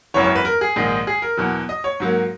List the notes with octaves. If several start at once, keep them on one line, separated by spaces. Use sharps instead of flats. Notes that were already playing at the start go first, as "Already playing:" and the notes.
G#1 F#2 C#3 E3 C#5
C#5
B4
A#4
G#4
A#1 G#2 D#3 G#3 D#4
G#4
A#4
E2 B2 F#3
D#5
C#5
G#2 F#3 A#3